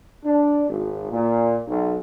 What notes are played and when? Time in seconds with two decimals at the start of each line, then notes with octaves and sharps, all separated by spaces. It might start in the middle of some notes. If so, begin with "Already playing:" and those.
0.24 D4
0.69 G#1
1.11 A#2
1.67 B1